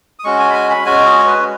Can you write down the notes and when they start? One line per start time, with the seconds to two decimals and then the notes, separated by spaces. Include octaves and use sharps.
0.19 D#6
0.24 G#3 C#4 F#4 C#6
0.39 G#5
0.50 B5
0.55 G#5
0.70 B5
0.85 G#3 C#4 F#4 G#5
1.05 D#5
1.19 C#5
1.26 B4